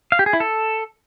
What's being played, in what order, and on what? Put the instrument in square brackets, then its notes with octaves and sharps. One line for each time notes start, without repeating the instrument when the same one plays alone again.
[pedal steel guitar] F5
G4
G#4
E4
A4